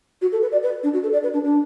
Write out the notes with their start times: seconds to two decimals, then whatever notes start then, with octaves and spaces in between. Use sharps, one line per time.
0.21 F#4
0.32 A4
0.42 B4
0.52 D5
0.63 B4
0.83 D4
0.93 F#4
1.03 A4
1.12 D5
1.23 B4
1.33 D4
1.44 D4